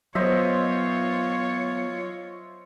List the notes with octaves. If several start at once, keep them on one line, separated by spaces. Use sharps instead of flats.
F#3 B3 F4 C5 C#5 D#5 E5